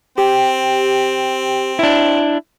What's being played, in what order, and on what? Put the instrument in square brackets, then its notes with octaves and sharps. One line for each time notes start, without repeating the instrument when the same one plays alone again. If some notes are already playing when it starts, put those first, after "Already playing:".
[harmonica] C4 [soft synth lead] G4 [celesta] G5
[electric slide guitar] D4 E4